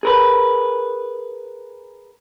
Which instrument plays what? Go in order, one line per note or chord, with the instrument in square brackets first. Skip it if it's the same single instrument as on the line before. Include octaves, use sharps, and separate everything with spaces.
[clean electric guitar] G#4 A#4 B4